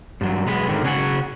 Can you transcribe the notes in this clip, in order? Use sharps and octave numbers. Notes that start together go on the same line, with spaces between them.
G2 F#3
B1 G#3 B3
G#2 D3 D#3
C#3 C#4 F#4 G#4 F#5